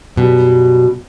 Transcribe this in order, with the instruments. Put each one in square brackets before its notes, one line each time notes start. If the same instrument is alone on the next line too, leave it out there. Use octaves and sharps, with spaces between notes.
[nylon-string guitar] F#2 B2 G3